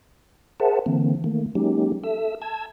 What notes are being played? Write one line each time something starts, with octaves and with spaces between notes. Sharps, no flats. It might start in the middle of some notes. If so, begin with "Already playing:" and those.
G#4 A#4 C5 E5 F#5 A5
D3 E3 A#3 C4
D#3 A3 A#3
F#3 G#3 A#3 C#4 D#4 G4
A4 E5 E6
A5 E6 G#6